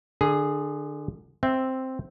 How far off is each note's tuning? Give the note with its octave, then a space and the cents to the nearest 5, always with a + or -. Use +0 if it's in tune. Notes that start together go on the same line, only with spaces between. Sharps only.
D3 +25 G#4 +0
C4 +0 E5 +0